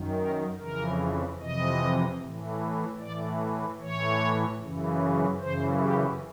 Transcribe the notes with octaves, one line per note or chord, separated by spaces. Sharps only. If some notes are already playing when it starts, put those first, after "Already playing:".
Already playing: F#2 D#3
A#4
F2 C#3 E3 A#4
F2 C3 E3 D#5
A2 E3
A2 E3 D5
A2 E3 C#5
F#2 C#3 E3
F#2 C#3 E3 C5
G4